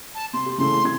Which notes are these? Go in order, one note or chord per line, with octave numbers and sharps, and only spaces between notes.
A5
C3 C6
G4
C#3 E3 A3 C6
C3 E3 G#6